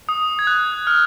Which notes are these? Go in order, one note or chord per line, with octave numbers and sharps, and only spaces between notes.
D#6
G#6
F#6
F6